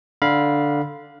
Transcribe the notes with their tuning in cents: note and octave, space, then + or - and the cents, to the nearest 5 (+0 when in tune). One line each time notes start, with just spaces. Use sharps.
D3 +0 F5 +0 B5 -25